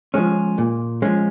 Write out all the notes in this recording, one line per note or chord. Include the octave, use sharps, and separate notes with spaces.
F3 G#3 C#4
A#2
F3 G#3 C#4